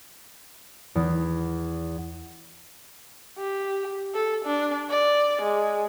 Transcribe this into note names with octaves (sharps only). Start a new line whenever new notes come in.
E2
G4
A4
D4
D5
G#3